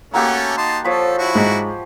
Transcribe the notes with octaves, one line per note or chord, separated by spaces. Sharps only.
A3 A#3 C#4 F#4 G4 A4
D#4 A5 C6
F3 A4 C#5 B5
E4 F#4
G#2